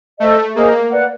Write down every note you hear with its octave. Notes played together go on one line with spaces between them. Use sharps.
A3 A4 C5 D#5
A#3 G#4 C5 D#5
B4 D5 F#5